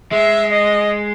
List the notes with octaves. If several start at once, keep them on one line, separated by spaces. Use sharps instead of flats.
G#3 E5
D#5